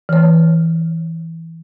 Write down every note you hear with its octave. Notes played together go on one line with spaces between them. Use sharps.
E3 C#5